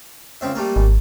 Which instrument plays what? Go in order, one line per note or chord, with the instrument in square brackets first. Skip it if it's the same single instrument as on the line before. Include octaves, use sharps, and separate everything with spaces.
[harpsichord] C#2 C4 E5
G3 A3 A#3
[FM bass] G#1